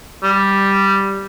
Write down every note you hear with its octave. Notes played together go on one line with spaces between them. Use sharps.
G3